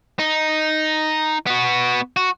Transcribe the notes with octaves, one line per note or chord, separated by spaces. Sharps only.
D#4
B3 F#4
F#4